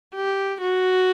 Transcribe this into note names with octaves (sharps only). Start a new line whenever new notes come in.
G4
F#4